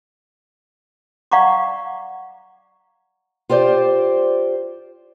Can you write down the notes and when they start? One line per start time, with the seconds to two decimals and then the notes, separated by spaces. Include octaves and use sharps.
1.32 D5 F5 F#5 A#5 C#6 D6
3.49 F4 G4 C5 D5